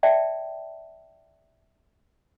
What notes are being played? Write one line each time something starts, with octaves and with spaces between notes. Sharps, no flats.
D5 E5 G5 A5